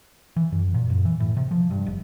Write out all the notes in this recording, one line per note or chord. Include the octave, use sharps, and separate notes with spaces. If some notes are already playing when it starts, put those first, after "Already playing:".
E3
F#2
A#2
F#2
E3
A2
C3
F3
G2
F1